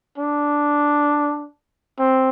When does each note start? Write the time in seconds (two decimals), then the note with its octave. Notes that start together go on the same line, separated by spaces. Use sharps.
0.18 D4
1.99 C4